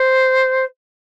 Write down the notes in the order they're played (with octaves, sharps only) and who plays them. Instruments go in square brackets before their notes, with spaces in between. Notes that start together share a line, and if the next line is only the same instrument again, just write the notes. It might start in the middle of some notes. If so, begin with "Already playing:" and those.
Already playing: [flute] C5